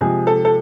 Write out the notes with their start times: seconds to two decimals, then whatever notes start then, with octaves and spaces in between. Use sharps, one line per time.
0.01 C3 F3 G#3 G#4
0.27 A4
0.45 A4